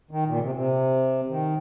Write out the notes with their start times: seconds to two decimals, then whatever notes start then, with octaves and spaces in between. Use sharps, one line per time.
0.11 D#3
0.26 A#2
0.36 C#3
0.41 C3
0.55 C3
1.28 D#3